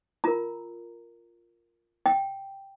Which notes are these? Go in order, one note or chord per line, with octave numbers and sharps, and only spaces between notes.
F4 A#4 A#5
G5